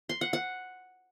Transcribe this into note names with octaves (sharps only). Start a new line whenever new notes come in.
C6
F#5
F#5